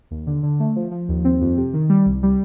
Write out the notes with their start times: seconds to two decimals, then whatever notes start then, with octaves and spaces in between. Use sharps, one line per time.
0.11 D#2
0.27 D3
0.43 D3
0.60 A3
0.76 F3
0.91 F3
1.09 D#2
1.25 C4
1.41 F2
1.57 C3
1.74 D#3
1.89 G3
2.06 C2
2.23 G3